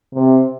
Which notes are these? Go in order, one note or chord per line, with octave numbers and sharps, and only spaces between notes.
C3